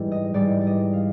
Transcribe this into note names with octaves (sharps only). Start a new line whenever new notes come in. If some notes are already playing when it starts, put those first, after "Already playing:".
Already playing: G#2 E3 G3
D#5
G#2 E3 G3 D5
D5
D#5
F5